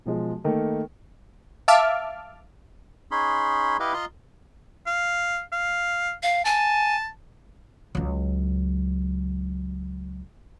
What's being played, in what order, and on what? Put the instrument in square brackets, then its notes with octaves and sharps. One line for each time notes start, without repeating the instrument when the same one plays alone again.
[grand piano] B1 F3 G#3
D#3 A3 A#3
[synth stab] E5 F5 A5 D6 F6
[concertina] C#4 D#4 G#4 B5 C6
E4 G4 B4 D#5 F5
F4 D#5 A#5 C6
[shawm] F5
F5
[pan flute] F5
[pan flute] G#5 [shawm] A5
[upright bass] C#2 F#3